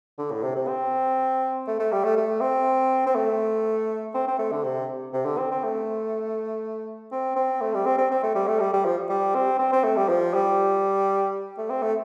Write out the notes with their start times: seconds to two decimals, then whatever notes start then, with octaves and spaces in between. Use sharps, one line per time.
0.18 D3
0.31 A2
0.43 C3
0.55 C3
0.68 C4
1.67 A3
1.79 A3
1.92 G3
2.04 A3
2.17 A3
2.41 C4
3.06 C4
3.15 A3
4.14 C4
4.28 C4
4.39 A3
4.52 D3
4.64 C3
5.14 C3
5.25 D3
5.38 C4
5.51 C4
5.64 A3
7.12 C4
7.36 C4
7.61 A3
7.74 G3
7.86 C4
7.98 C4
8.11 C4
8.23 A3
8.35 G3
8.48 A3
8.60 G3
8.73 G3
8.85 F3
9.09 G3
9.35 C4
9.59 C4
9.72 C4
9.84 A3
9.96 G3
10.09 F3
10.34 G3
11.58 A3
11.70 C4
11.82 A3